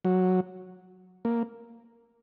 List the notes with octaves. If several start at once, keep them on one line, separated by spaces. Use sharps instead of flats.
F#3
A#3